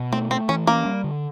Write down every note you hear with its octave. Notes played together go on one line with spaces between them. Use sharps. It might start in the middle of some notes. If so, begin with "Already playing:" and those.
Already playing: B2
A3 C4
A3 C4
E3 C#4
A#3 C#4
G3
D3